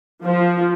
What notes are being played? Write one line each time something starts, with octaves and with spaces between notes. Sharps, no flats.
F3